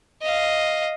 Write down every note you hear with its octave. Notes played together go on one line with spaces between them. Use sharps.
D#5 F5